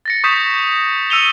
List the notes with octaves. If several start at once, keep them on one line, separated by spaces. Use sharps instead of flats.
A6 A#6 C#7
C#6 D#6 G6 B6 E7
D#6 E6 C#7 D#7 F7 G7